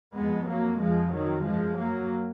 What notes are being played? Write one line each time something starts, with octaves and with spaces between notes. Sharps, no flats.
F2 G#3 B3
F#3 A#3
F2 F3 G#3
D#3 F#3
F#2 F3 G#3
F#3 A#3